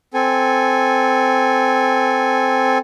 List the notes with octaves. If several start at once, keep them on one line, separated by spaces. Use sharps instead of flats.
C4 A4 G#5